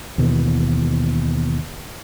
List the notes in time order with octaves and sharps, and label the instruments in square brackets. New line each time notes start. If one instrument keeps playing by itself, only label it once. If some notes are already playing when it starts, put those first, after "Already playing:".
[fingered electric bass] D#2 B2 E3